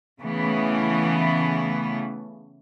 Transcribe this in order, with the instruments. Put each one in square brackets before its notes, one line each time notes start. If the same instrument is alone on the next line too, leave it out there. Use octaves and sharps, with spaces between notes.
[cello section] C#3 E3 A3 B3